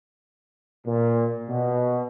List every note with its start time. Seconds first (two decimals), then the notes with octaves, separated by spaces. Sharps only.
0.86 A#2
1.48 B2